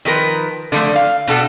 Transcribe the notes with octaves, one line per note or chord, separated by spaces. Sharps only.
D#3 F3 A#4 B4
D3 F3 A3
F5
B2 D4 A4 F#5